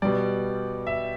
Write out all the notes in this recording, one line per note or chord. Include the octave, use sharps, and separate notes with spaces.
B2 G3 D5
E5